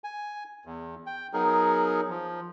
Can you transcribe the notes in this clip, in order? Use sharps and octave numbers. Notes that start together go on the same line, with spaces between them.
G#5
E2
G5
F#3 B3 D#4 G#4 A#4
F3